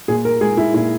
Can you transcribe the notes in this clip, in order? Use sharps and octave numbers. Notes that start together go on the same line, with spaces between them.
A#2 G#4
A#4
G#3 G#4
E4
A#2 E4